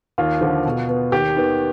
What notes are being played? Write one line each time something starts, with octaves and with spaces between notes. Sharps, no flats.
D#2 F4
D3 F3
B2
B3
D#2 G4
D#3 B3